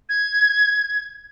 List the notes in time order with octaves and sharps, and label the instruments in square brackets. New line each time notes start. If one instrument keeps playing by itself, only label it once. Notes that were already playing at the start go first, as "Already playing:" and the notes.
[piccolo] G#6